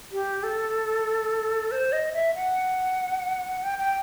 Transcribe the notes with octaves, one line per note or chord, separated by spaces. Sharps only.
G4
A4
C5
D#5
E5
F#5
G5
G5